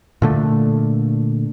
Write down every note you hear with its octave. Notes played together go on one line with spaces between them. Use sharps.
A#2 D3 A3